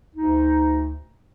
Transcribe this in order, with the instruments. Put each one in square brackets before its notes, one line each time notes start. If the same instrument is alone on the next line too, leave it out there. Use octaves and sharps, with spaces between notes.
[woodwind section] D2 D#4